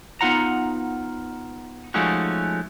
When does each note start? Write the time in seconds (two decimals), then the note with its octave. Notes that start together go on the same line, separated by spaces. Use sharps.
0.21 B3 D#4 F4 F#5 A#5
1.94 F3 G#3 A3 C#4 D#4 F#4